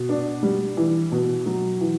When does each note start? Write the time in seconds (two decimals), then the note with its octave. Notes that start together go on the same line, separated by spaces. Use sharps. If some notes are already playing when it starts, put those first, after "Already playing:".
Already playing: B2
0.09 D4
0.43 G3
0.77 E3
1.12 B2
1.46 F#3
1.81 E3